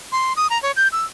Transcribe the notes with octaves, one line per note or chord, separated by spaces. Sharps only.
C6
D#6
A#5
C#5
G6
E6